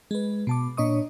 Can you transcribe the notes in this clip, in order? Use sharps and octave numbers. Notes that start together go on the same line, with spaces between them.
G#3 B4
B2 A5 D6
A#2 D4 C#5 D#5 C#6 D#6